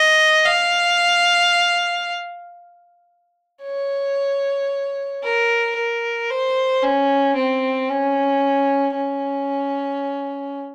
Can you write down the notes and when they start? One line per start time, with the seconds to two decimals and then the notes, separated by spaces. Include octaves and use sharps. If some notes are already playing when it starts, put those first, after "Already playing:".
Already playing: D#5
0.45 F5
3.63 C#5
5.23 A#4
5.76 A#4
6.29 C5
6.82 C#4
7.36 C4
7.89 C#4
8.95 C#4